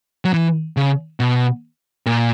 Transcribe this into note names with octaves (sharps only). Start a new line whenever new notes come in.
F#3
E3
C#3
B2
A#2